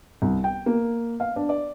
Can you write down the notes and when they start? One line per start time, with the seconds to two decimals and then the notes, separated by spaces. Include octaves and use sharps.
0.22 C2
0.44 G5
0.66 A#3
1.20 F5
1.36 D4
1.49 D5